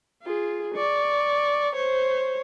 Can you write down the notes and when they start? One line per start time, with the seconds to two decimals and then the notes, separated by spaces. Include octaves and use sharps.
0.22 F4 G#4
0.75 D5 C#6
1.76 C5 C#5